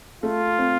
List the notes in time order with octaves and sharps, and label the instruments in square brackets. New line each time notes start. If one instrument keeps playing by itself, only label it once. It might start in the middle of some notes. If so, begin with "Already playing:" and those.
[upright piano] A3 [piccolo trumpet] F4
[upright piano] C4